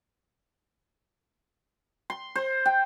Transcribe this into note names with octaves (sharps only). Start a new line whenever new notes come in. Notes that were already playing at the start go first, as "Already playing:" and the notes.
C6
C5
G5